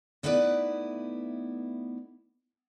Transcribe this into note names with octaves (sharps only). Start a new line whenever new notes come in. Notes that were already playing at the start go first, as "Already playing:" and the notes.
A3 B3 D#4 E4 B4 D5